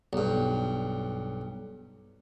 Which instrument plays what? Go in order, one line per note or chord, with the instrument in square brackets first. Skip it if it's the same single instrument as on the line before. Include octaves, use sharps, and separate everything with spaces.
[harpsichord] B1 G2